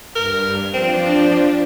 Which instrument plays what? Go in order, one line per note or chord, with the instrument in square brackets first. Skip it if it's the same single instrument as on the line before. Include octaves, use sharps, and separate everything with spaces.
[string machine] G2 [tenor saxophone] A#4
[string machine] F3 D4 [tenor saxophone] C4